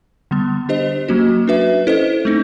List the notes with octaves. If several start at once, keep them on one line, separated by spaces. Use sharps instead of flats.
D3 G3 B3
D4 G4 C5 D#5
F#3 A#3 C#4 F#4
D4 F#4 B4 E5
C#4 E4 A4 C5 D#5
A3 C4 D#4